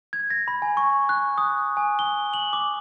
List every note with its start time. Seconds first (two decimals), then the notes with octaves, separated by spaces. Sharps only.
0.13 G#6
0.30 A#6
0.48 B5
0.62 G#5
0.77 C#6
1.09 F#6
1.38 D#6
1.77 G#5
1.99 G7
2.34 F#7
2.53 D6